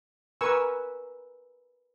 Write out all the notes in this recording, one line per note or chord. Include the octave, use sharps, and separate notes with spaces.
A#4 B4 G#5 C#6 E6